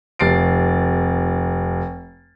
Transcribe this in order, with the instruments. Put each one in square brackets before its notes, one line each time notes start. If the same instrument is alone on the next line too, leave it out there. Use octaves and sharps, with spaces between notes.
[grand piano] F1 A6 C7 D7